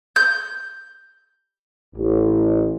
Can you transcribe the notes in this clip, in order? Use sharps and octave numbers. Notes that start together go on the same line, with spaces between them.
G6
A1